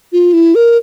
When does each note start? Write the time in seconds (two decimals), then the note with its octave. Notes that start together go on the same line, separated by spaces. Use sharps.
0.12 F4
0.33 E4
0.55 A#4